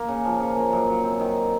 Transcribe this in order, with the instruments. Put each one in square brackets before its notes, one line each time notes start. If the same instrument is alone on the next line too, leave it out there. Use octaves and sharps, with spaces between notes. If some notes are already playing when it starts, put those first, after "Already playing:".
Already playing: [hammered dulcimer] A#3
C#3
F3
C#3
A#3
F#2
F#3
C4
D#3